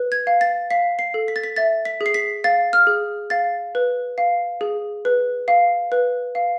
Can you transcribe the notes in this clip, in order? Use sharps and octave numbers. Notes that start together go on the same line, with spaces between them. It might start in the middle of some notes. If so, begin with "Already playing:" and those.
Already playing: B4
G#6
F5
A6
F5 B6
C7
A4
B6
A6
B6
E5 A6
B6
G#4
C7
B6
F5 A6
F6
G#4
F5 A6
B4
F5
G#4
B4
F5
B4
F5